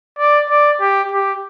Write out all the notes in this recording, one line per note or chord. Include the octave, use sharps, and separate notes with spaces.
D5
D5
G4
G4